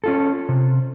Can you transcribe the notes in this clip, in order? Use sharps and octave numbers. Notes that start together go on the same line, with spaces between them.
C#4 F4 A4
C3